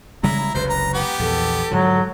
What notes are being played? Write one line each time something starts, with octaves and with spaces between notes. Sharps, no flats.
C#3 G3 G#3 E4 A#5
F#1 C#2 C3 B4 C5
A#5
B3 G4
A#1 E2 A4
G#2 D3 F3 F#3